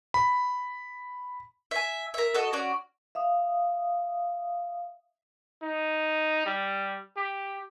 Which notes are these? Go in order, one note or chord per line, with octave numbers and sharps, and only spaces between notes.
B5
E5 G#5
A#4 E5
F#4 A4 D#5
C#4 F#4 D5
E5 F5 D#6
D#4
G3
G4